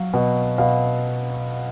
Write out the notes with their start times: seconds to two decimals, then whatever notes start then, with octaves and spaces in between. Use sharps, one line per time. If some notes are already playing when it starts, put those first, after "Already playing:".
Already playing: F#3 F5
0.14 B2
0.58 B2 F5